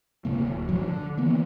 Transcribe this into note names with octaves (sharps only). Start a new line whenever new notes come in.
F1 D2 C3 A#3
D1
A2 F3 F#3
D3
D#3 E3 A#3 B3